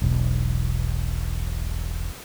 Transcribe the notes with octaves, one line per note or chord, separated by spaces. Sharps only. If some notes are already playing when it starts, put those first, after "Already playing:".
E1 B1